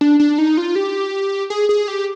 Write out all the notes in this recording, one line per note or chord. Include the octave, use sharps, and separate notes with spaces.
D4
D4
D#4
F4
G4
G#4
G#4
G4